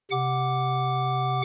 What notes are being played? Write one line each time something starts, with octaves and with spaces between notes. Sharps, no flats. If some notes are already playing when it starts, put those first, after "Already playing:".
C3 F#5 D6